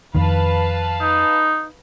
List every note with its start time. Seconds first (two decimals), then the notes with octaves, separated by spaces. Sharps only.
0.15 F2 D#3 B4 F5 A5
1.01 D#4